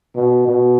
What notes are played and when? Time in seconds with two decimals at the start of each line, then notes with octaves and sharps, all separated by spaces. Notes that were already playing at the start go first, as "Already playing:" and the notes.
0.16 B2
0.47 B2